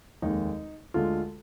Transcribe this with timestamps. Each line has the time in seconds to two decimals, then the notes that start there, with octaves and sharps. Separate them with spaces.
0.22 F1 D#2 D#3 G#3 D#4
0.94 D2 D3 G#3 F4